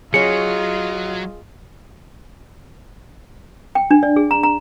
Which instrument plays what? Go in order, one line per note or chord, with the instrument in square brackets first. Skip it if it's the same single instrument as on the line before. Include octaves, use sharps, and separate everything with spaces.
[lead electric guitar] F#3 [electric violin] F4 D#5 [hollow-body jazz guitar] G#4 C#5 [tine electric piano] C#7
[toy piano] G5
D4
D5
G#4
A#5
A#5